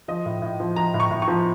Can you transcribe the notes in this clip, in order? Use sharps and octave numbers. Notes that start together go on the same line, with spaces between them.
F3 D#5
A2
A2
F3
F3 A#5
A2
C#6
A2
C#6
F3